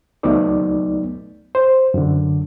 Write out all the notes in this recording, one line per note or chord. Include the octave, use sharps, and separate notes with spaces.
C#2 F#3 A3 B3 D#4 D5
C5
F#2 D3